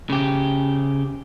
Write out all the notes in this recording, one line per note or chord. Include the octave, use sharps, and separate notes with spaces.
C#3 G4